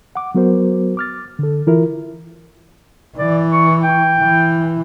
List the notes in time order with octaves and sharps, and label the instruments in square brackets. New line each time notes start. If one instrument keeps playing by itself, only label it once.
[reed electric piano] F#5 D6
F#3 B3 F#4 A#4 C5
D6 F6 A6
D3 A4
E3 E4 F4 A#4 E5
[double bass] E3 [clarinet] D5
[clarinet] C#6
G5
[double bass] E3